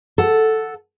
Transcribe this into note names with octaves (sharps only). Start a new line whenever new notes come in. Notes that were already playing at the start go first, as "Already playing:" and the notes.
A4 F#5